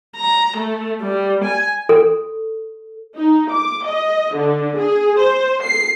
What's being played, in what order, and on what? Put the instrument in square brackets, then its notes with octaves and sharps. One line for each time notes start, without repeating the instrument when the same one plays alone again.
[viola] A#5
A3
G3
G#5
[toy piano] A4
[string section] D#4
D6
D#5
D3
G#4
C5
C7